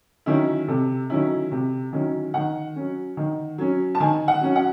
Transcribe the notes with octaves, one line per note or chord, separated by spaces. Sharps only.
D#3 F#3 C#4 E4
C3 A4
D#3 F#3 C#4 E4
C3
D#3 F#3 C#4 E4
D#3 F#5
F#3 C#4
D#3
F#3 C#4
A5
D#3 G#5
F#5
F#3 C#4
F#5